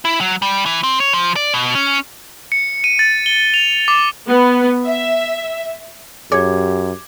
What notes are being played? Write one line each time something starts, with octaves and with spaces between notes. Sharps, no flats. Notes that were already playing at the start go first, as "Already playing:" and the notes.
E4
F#3
G3
E3
C4
C#5
F3
D5
B2
C#4
C#7
D#7
A6
G7
F7
D6
B3
E5
F#2 G4 G#4 C#5 D6 G#6